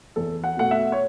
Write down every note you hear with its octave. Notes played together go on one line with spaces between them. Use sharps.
E2 A4
F#5
B2 A3 F#5
E5
C#5